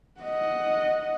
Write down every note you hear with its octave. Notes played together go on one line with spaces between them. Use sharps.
D#5 F#5